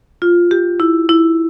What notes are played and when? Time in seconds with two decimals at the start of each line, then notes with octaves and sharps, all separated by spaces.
0.22 F4
0.51 G4
0.80 E4
1.09 E4